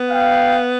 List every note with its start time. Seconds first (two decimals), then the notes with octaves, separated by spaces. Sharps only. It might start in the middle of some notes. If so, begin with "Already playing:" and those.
Already playing: B3
0.10 F5 G5